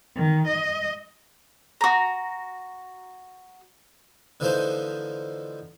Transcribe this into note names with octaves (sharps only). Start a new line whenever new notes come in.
D#3
D#5
F#4 A#5
D3 E3 F3 A3 D#4 C5